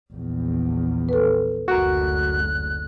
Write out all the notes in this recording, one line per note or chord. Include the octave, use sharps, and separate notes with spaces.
A#1 E2
A4 B4
F#1 D2 F#4 A#4 F#6